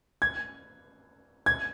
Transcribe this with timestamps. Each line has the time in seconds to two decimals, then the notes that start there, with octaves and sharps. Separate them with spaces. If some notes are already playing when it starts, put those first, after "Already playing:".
0.22 G#6
1.46 G#6